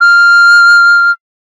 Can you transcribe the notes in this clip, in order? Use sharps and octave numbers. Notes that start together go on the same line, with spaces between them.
F6